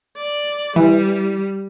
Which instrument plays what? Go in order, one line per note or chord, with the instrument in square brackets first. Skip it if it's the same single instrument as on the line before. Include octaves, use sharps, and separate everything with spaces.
[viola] D5
[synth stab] E3 [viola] G3